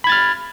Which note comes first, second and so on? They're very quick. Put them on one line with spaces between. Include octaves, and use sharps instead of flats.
B5 G#6 A6 F6